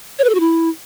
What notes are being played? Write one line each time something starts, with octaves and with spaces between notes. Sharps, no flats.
C#5
B4
A4
F#4
E4